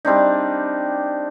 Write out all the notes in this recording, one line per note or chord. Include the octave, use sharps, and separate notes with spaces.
G3 C4 D4 D#4